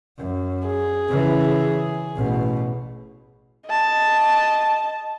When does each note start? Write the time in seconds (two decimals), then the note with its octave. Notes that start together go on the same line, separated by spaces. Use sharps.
0.17 F#2
0.67 G#4
1.08 C#3 E3
2.16 A1 B2
3.67 D#5 A5